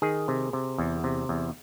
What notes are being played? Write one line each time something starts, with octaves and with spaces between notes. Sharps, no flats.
D#3 G#4
C3
C3
E2
C3
E2